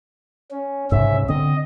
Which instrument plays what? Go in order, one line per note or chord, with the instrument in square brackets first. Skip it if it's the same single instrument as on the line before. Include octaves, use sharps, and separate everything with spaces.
[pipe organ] C#4
[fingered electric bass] C2 G#2 [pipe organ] C#3 C#4 E5
[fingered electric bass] D3 C4 [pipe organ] D#5